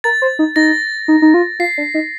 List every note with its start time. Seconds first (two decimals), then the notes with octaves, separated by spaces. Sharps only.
0.04 A#4 A6
0.22 C5
0.39 D#4
0.56 D#4 A#6
1.08 D#4
1.22 D#4
1.34 F4
1.60 F4 C7
1.78 D4
1.94 D#4